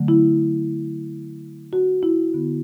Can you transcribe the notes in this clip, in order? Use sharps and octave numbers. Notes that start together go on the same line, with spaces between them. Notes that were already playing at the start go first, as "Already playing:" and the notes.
Already playing: D3 F#3 A3
E4
F#4
E4
D3 B3